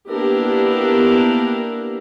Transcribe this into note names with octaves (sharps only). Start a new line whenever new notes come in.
A#3 B3 D4 E4 G4 A#4